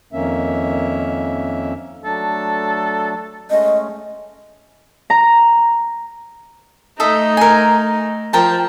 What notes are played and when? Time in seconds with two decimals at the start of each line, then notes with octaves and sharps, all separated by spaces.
0.13 F2 D#3 A#3 C#4 E5
2.05 F#3 A3 D4 A4
3.51 G#3 A3 C#4 D#5
5.10 A#5
7.00 A3 D#4 A4 D#5 E5
7.37 A#4 G#5
8.33 F3 A#4 G5 A5